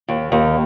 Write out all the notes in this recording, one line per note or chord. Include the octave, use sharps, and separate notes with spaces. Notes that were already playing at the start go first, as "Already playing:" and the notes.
D#2
D#2